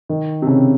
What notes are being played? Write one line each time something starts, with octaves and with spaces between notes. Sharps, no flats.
D#3
C3
C#3